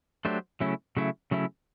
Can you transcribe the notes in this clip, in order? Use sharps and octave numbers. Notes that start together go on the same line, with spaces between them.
F#3 A3 D4 G4 C5
C#3 F#3 A3 C#4 E4
C#3 F#3 A3 C#4 E4
C#3 F#3 A3 C#4 E4